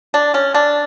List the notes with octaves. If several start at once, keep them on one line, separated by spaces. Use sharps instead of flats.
D4
C#4
D4